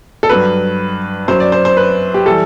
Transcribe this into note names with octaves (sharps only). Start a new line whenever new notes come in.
A4
G2 F#3 B4
F#2 F#3 C5
D5
C5
C5
B4
G4
E3 G3 A4